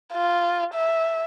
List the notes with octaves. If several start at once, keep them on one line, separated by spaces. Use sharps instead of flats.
F4
E5